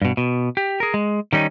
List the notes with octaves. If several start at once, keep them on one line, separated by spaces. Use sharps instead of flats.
G2 B2
B2
G4
G#4 A#4
G#3
D#3 G3 C#4 D#4